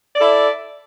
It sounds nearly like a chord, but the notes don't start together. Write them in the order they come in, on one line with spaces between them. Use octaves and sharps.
D5 A4 E4